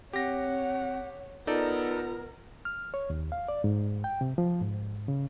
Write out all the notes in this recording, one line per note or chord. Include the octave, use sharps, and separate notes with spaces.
C4 G4 C#5 F#5 A#6
B3 D#4 F4 A4 A#4 D5 A#5
F6
C#5
D#2
F5
D5
G#2
G5
C3
F3
G#2
C#3